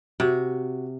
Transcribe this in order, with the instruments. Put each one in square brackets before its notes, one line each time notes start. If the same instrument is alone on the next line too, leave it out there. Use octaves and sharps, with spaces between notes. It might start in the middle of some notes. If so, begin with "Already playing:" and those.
[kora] C3 [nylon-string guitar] F#4